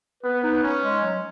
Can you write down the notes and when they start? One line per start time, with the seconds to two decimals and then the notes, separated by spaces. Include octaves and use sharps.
0.23 B3 B4
0.43 D#4
0.63 C#4
0.82 G#3
1.02 F#3